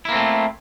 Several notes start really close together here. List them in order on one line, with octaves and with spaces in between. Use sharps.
E4 A#3 C4 A3